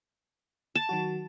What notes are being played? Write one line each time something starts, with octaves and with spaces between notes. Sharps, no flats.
A5
D#3 F#3 F#4